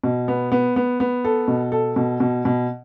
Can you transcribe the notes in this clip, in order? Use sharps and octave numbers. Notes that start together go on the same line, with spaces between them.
B2
B3
B3
B3
B3
A4
B2
A4
B2
B2
B2